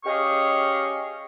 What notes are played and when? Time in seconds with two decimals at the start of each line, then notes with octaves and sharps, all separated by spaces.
0.05 C#4 G4 G#4 D#5 F5 C#6